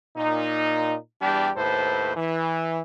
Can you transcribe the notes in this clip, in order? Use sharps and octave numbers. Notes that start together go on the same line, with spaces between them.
A#2 D#4
E2 G3 D4 G4
D#2 A2 A4 B4 C5
E3